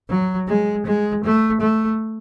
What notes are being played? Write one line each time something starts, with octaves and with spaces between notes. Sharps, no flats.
F#3
G#3
G#3
A3
A3